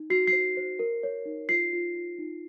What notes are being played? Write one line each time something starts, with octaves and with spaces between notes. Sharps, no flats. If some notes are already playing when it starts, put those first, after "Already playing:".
Already playing: D#4
F#4 C7
C7
C5
C5
A#4
C#5
D#4
F4 C7
F4
F4
D#4